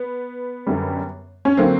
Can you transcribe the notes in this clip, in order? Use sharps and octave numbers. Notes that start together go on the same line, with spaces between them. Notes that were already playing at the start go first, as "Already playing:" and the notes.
Already playing: B3
F#2 D3 G3
C#4
D3 F#3 A#3 C4